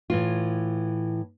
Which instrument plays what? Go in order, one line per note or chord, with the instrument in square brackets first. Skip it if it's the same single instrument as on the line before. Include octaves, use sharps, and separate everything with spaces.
[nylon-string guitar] A2 E3 F4